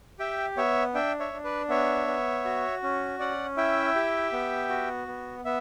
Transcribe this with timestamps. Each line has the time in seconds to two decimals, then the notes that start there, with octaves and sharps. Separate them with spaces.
0.19 G4 E5 G5
0.57 B3 C#5 E5
0.94 D4 E5 G5
1.20 C#5 E5
1.33 D4
1.44 B4 D5
1.69 B3 C#5 E5
2.07 B3
2.44 F#4
2.83 C#4
3.19 C#4 D5 F#5
3.57 E4 E5 G5
3.95 G4
4.32 B3
4.70 F#4
5.07 B3
5.45 B3 E5